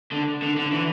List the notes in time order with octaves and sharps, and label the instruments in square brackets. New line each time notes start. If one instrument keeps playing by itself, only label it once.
[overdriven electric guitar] D3
D3
D3
E3